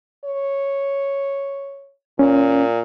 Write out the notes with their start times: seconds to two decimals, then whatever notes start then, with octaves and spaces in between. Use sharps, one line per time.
0.25 C#5
2.19 A#2 C#4